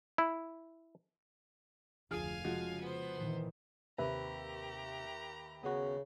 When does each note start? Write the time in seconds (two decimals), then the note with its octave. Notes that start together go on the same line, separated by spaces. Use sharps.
0.18 E4
2.11 F1 D2 F3 G#4 F5 G#5 F6
2.44 C#3 F3 G#3 F#4
2.81 B3 C5
3.17 A#2 D#3 E3
3.98 D#2 C3 G4 B4 E5 A#5
5.63 C#3 B3 F#4